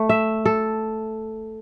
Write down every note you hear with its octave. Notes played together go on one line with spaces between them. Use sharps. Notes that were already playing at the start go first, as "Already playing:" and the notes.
Already playing: A3
E5
A4